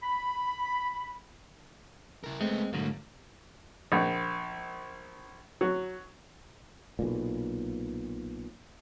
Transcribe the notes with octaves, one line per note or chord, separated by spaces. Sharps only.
B5
E4 A#4
G#3 A3 B3 C4
G#2 D3 F#3 A3 A#3
A#1
F#3
B1 A#2